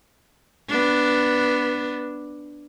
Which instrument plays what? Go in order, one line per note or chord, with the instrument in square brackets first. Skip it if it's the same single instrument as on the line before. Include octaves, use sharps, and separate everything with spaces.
[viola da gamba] B3 D4